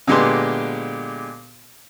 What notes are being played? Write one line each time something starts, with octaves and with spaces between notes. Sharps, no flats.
A#2 D3 G#3 B3 G4 C6